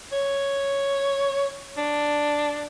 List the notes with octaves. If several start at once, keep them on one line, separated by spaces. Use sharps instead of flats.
C#5
D4